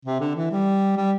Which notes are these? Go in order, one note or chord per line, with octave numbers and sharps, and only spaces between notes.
C3
D3
E3
G3
G3